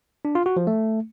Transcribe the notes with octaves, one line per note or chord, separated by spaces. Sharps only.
D4
F4
F#4
F3
A3